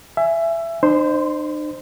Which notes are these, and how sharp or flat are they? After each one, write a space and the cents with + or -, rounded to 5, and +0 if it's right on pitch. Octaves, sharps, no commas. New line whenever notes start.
E5 +20 G#5 +0
D#4 -45 C5 +0 C6 -40